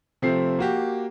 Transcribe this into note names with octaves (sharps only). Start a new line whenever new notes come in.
C3 F3 A3 C4 C7
A#3 F#4 G4